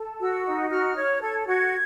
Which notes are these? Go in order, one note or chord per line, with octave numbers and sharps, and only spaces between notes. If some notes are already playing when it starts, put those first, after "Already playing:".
Already playing: A4
F#4 E6
D#4
F#4 F6
C#5
A4 G#6
F#4 G#6